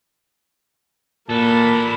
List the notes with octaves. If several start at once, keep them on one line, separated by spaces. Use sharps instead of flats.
A#2 A#3 A4 B4 A5 B5